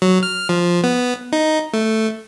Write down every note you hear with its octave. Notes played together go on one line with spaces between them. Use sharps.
F#3
F6
F3
B3
D#4
A3